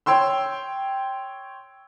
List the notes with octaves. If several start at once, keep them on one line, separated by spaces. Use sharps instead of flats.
C#5 G5 C6 E6